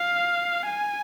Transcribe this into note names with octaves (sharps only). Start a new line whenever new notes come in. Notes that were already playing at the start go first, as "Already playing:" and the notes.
Already playing: F5
G#5